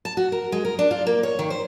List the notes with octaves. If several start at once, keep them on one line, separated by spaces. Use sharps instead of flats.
A5
F#4
A#4
G#3
A#4
D4
F4
A#3
C#5
D#3
C5